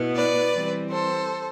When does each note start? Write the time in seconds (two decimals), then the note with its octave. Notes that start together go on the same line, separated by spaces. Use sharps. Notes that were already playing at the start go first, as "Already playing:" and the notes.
Already playing: B2 B3 E4
0.15 B4 D5
0.53 E3 G3 C4
0.90 A4 C5